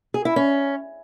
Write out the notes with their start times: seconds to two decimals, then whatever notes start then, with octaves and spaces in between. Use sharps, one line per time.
0.14 G#4
0.25 E4
0.36 C#4